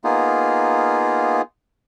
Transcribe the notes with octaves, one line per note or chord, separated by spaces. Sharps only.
A#3 B3 D#4 F4 G#4